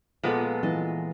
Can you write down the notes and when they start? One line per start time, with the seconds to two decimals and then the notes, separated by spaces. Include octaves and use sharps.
0.23 A#2 F3 G#3 B3 A4
0.63 E3 D#5 A5